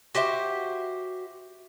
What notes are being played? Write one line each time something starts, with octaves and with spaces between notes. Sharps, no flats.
F#4 G4 C5 E5